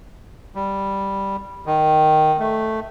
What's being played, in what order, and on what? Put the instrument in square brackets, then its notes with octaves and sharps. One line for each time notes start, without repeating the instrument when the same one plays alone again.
[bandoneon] G3
D#3
A3